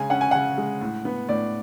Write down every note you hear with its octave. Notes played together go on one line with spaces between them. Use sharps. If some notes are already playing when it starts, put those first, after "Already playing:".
Already playing: C#3 G#3 G#5
C#4 F#5
G#5
C#3 F#5
G#3
A2
B3
A2 D5